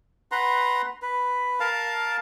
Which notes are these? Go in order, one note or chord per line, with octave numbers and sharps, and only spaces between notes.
B4 F#5 A#5 C6
B4
A#4 F5 A5